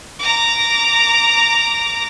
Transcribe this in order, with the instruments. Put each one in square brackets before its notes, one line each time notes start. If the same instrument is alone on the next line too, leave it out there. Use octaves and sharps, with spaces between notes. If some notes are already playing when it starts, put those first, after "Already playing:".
[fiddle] A#5 D6